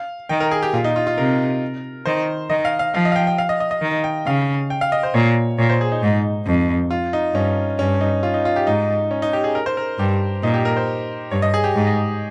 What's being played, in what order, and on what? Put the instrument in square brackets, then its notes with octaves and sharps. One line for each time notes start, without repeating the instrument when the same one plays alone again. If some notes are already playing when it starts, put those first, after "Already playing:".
Already playing: [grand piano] F5
[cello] D#3 [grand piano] G5
[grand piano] A#4
G#4
G4
[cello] A#2 [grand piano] F4
[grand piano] D#4
F4
F4
[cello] C3 [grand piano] A#4
[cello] D#3 [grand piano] C5
[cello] D#3 [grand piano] D#5
[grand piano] F5
F5
[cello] F3 [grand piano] F5
[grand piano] D#5
F5
G5
G5
F5
D#5
D#5
D#5
[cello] D#3
[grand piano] G5
[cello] C#3 [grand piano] F5
[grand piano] G5
F5
D#5
C5
[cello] A#2 [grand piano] C#5
[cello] A#2 [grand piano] C#5
[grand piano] C5
G#4
D#4
[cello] G#2
F2
[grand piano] F4
D#4
[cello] G2 [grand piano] C#4
[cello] G2 [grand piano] C#4
[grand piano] D#4
F4
D#4
F4
G4
[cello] G#2 [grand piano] D#4
[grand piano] C#4
D#4
G4
G#4
A#4
C5
A#4
[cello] G2 [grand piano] G4
[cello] A#2 [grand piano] D#4
[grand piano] G4
A#4
C5
[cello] G2 [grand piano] C#5
[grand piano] D#5
G#4
G4
[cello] G#2